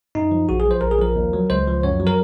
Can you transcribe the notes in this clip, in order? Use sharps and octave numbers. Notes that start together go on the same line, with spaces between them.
F#2 D#4
F3
A#1 F#4
G#4
F3
C5
A#1 A#4
G#4
F3 A#4
D#2
F#3
C#2 C5
F3
F#2 C#5
F#3
A#4